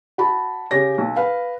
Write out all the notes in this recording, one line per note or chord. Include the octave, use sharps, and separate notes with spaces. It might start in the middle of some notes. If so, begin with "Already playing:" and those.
F#4 A5 B5
C#3 G4 C#5 A#6
B1
B4 F5